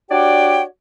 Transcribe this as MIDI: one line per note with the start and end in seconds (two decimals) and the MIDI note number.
0.10 0.63 62
0.10 0.63 66
0.10 0.63 67
0.10 0.63 73
0.10 0.63 74
0.10 0.63 79